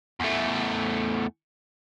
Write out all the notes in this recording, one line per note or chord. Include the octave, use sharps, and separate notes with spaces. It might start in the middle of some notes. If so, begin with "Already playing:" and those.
E2 A3